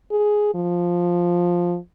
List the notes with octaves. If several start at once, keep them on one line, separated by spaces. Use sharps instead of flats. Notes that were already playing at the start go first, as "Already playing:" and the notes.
G#4
F3